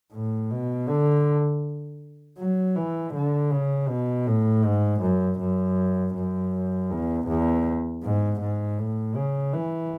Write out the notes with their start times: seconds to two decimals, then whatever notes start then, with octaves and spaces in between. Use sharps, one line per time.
0.12 A2
0.51 B2
0.88 D3
2.38 F#3
2.76 E3
3.14 D3
3.51 C#3
3.88 B2
4.27 A2
4.65 G#2
5.01 F#2
5.40 F#2
6.15 F#2
6.91 E2
7.28 E2
8.03 G#2
8.41 G#2
8.78 A2
9.15 C#3
9.54 E3